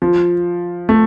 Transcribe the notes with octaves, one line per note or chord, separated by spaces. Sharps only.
F3
A3